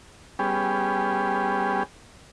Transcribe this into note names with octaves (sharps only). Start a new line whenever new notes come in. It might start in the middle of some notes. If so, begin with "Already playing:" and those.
G3 B3 C#4 G4 G#4